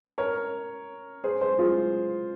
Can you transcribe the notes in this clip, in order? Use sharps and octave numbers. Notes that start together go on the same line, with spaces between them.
A#4 C#5
G#4 C5
G#4 C5
F4 G#4